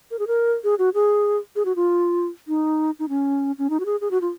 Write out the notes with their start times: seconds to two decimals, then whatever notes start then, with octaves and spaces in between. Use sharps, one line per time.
0.11 A#4
0.19 G#4
0.27 A#4
0.64 G#4
0.79 F#4
0.94 G#4
1.56 G#4
1.65 F#4
1.76 F4
2.48 D#4
2.99 D#4
3.09 C#4
3.58 C#4
3.70 D#4
3.80 F#4
3.86 G#4
4.01 G#4
4.11 F#4
4.21 F4